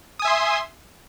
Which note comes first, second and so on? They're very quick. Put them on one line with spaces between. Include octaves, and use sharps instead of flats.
D#6 G#5 E5 C6